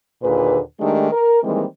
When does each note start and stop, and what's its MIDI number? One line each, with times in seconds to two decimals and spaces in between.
0.22 0.59 39
0.22 0.59 46
0.22 0.59 50
0.22 0.59 68
0.22 0.59 71
0.80 1.12 51
0.80 1.12 56
0.80 1.12 57
0.80 1.12 62
0.80 1.12 63
0.80 1.12 67
1.12 1.42 70
1.44 1.64 51
1.44 1.64 52
1.44 1.64 55
1.44 1.64 56
1.44 1.64 58
1.44 1.64 60